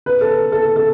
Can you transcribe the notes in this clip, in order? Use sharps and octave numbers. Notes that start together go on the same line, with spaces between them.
B4
A4
A4
A4